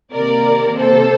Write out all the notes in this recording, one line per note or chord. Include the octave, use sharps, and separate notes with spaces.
C3 D#3 A#3 A#4 D5
A4 C5